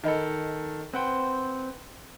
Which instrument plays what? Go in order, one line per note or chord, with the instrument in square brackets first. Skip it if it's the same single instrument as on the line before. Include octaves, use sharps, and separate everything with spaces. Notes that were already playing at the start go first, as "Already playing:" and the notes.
[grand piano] D#3 A4 [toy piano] D#4 D#5 B5
[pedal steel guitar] C4 C5 [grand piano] B4 F#5 G5